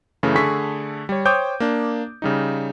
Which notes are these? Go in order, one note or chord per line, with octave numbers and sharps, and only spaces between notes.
F#2 C#3 E3 A3
D3 A3 G#4 A4 C#6 B6
G3 C#5
C5 C#5 G5 D6 D#6 G6
A#3 D4
C#3 G3 D#4